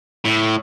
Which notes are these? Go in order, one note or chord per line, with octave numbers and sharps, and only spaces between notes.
A2